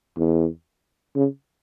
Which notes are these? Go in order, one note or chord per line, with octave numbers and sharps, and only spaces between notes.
E2
C#3